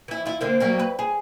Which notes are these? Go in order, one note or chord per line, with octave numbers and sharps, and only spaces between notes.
E3 E4
E4 F4
D3 A#3 C4
F#3 G3 A#3
B4
G#4